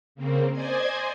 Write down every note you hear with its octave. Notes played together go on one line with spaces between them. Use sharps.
C#3 A#3 C4
C5 D5 D#5 G#5 G#6